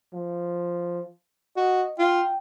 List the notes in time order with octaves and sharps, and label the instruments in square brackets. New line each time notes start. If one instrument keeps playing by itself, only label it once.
[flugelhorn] F3
[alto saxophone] F#4 [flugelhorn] D#5
[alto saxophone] F4 [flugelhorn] G5